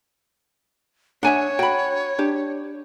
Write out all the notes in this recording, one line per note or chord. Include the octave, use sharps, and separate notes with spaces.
D4 C#5 E5 F#5 G#5
F#4 G5 B5
D4 G4